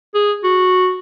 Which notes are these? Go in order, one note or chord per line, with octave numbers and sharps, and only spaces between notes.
G#4
F#4